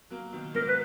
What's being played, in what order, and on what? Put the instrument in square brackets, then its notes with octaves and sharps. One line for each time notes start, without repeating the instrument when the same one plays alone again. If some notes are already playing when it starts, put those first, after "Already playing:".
[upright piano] F#3 A#3
B2 D#3
[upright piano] G#2 B2 [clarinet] A#4
[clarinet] B4